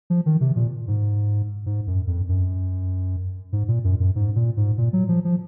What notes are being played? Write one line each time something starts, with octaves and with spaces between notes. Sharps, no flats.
F3
D#3
C3
A#2
G#2
G#2
F#2
F2
F#2
G#2
A#2
F#2
F#2
G#2
A#2
G#2
A#2
F#3
F3
F3